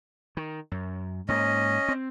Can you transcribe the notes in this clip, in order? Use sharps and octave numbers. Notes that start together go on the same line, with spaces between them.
D#3
F#2
G#2 A#3 C#4 D#5
C4